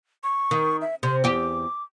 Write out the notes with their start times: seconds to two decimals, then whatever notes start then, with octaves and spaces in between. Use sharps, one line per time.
0.23 C#6
0.51 D#3
0.81 E5
1.03 C3 C6
1.24 E2 G4 D6